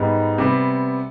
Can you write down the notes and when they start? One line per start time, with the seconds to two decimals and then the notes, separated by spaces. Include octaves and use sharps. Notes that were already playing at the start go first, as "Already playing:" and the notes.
Already playing: G#2 G3 B3 D#4
0.38 C3 G3 B3